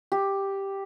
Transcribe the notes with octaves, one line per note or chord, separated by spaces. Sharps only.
G4